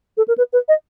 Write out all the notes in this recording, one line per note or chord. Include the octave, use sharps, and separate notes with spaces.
A4
A#4
B4
B4
D#5